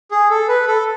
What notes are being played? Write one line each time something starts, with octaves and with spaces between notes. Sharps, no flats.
G#4
A4
B4
A4